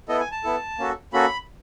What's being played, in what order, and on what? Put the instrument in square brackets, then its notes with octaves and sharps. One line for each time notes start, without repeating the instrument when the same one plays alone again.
[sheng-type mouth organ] B3 E4 A4 D#5
G#5
A5
B3 E4 A4
A#3 C#4 F#4 A4
A#3 C#4 F#4 A4 B5